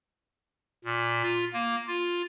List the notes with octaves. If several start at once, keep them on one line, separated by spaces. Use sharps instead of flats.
A#2
F4
A#3
F4